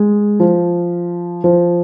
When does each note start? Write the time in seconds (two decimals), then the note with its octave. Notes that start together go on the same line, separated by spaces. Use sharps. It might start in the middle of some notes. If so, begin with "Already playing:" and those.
Already playing: G#3
0.40 F3
1.44 F3